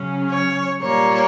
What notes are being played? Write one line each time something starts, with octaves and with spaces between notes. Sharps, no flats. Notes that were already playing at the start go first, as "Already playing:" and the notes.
Already playing: C#3 F#3 C#4
C#5
A#2 G3 A#3 C#5